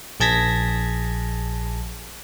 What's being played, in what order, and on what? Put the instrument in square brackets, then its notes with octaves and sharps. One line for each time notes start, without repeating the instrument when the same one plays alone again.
[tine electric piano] A#1 G#4 A5 G#6 A#6 B6